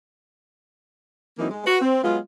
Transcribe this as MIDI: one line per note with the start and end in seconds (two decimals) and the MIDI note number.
1.38 1.50 52
1.38 1.50 54
1.38 1.50 58
1.38 1.50 60
1.38 1.50 63
1.38 1.50 64
1.50 1.66 56
1.66 1.80 66
1.66 1.80 71
1.81 2.02 60
2.03 2.18 54
2.03 2.18 56
2.03 2.18 59
2.03 2.18 65